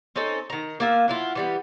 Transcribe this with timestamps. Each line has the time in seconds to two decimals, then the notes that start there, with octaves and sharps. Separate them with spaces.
0.16 C4 C#4 D#4 A4
0.50 D#3 A#5
0.80 A#3 F4 E5
1.08 F#3 E4 F4
1.35 E3 G3 B3